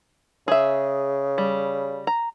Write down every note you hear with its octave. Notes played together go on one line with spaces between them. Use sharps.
C#3 G#4 E5
G3
A#5